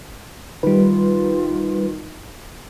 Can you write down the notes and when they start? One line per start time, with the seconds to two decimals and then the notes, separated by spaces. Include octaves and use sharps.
0.63 D#3 G3 F4 B4